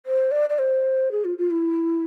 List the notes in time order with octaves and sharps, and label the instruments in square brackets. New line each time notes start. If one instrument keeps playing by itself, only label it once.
[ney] C5
D5
D5
C5
G#4
F4
F4
E4